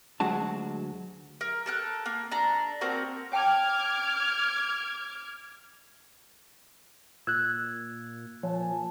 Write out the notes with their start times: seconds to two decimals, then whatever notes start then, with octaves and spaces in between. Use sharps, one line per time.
0.20 D2 F#3 G#3 F#4 A5
1.41 A#4
1.66 A4 A#4 F#6
2.06 A#3
2.31 D4 A4 A#5
2.81 A#3 C4 F#4 A#4
3.32 C#5 G5 A5 D6 F6 G#6
7.27 A#2 E6 F#6 G#6
8.43 A#2 F3 C#5 G#5 A5